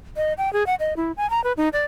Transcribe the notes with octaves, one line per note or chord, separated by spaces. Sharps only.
D#5
G5
G#4
F#5
D#5
E4
G#5
A#5
B4
D#4
D5